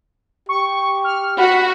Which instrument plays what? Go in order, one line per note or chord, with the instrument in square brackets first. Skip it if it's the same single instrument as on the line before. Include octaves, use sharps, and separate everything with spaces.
[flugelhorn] G4 [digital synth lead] C#6
[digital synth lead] F6
[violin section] F#4 [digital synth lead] B5